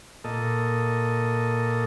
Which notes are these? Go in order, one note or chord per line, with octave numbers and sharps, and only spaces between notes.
A#2 A4 D#5